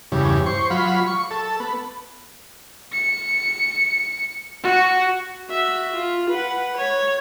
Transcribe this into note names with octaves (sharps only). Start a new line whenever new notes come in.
E2 G2 C#3
C5 C#6
F#3 F4 B5
C#6
A4
B3
C#7
F#4
F#4 E5
F4
B4 F#5
C#5